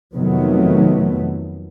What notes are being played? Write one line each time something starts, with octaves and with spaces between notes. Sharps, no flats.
F2 C3 D#3 F#3 A3 B3